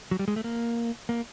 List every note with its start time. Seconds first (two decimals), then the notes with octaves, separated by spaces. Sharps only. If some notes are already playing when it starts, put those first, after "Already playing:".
0.11 F#3
0.19 G3
0.28 G#3
0.36 A3
0.44 A#3
1.09 A#3